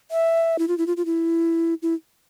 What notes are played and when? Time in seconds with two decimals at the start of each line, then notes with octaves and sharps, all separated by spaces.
0.11 E5
0.59 E4
0.68 F4
0.78 E4
0.87 F4
0.97 F4
1.06 E4
1.82 E4